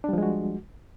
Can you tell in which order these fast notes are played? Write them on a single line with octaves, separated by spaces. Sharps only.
D4 G3 F3 G#3 F#4